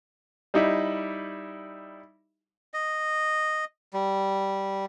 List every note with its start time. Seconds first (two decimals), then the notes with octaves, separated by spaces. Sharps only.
0.54 G3 D#4 E4
2.74 D#5
3.93 G3